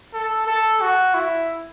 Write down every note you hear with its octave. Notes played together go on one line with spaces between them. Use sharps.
A4
A4
F#4
E4